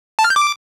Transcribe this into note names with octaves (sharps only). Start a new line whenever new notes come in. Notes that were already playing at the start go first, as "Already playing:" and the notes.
A5
F6
G6
D6